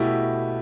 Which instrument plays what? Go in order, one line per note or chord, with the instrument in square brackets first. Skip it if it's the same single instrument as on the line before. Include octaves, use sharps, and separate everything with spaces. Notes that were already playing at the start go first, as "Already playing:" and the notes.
Already playing: [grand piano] B2 A3 E4 G4